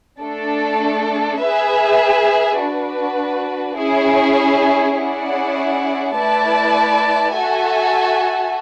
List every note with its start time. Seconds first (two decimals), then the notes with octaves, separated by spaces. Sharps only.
0.21 A3 D4 A4
1.40 G#4 B4 E5
2.59 D4 F#4 B4
3.78 C#4 E4 G#4
4.97 C#4 E4 G#4 D5 F#5
6.15 A3 E4 B4 D5 A5
7.34 F#4 A4 E5 G#5